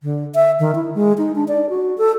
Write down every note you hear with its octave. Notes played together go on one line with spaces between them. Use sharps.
D3
E5
D#3
E4
G#3
D#4
D4
D5
F#4
A4